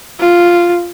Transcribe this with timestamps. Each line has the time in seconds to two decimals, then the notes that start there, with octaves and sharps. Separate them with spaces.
0.19 F4